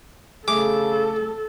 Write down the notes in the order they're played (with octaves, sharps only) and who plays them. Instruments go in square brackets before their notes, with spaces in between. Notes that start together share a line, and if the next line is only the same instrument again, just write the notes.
[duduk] C#3 [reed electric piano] A3 G#4 [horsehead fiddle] A4 [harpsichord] D6